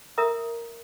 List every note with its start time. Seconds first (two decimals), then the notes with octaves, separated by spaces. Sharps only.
0.18 A#4 E5 A#5 D#6